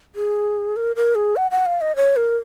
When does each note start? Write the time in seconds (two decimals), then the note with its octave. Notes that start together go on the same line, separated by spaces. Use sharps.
0.15 G#4
0.76 A#4
0.96 A#4
1.15 G#4
1.36 F#5
1.51 F#5
1.66 F5
1.81 D#5
1.96 C#5
2.16 A#4